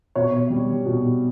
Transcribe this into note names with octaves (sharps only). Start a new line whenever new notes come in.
B2 C#5
G3
B2